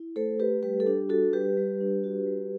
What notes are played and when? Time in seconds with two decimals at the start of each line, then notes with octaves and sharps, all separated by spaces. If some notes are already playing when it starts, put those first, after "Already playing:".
Already playing: E4
0.16 A3 A4 C5
0.39 A3 G4 B4
0.63 G3 G4 B4
0.80 A4
0.86 D4 G4
1.09 F#4 A4
1.33 G3 G4 B4
1.57 G3
1.81 D4
2.04 F#4
2.27 G3